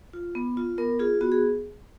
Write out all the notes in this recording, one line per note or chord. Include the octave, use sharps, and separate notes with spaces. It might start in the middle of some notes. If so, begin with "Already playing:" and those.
F4
B3
F4
B3 A#4
F4 G#4
B3 F#4
G#4